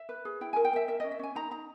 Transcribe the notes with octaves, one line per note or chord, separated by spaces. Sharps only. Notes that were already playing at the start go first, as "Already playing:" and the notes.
Already playing: E5
B4
G#4
E4 G5
A#4 G#5
G5
A#4 E5
A#4 E5
D#5
C#4
E5
C#4 G#5
D#4 A#5
D#4 A#5